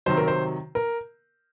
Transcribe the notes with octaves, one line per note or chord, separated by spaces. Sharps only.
C3 D#3 F#3 C5
A#4
C5
A#4